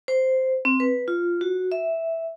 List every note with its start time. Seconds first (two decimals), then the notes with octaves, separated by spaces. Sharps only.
0.08 C5
0.65 C4
0.80 B4
1.08 F4
1.41 F#4
1.72 E5